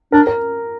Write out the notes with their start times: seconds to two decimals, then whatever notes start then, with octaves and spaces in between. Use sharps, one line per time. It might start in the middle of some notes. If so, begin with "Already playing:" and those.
0.12 D4 A#4
0.27 A#4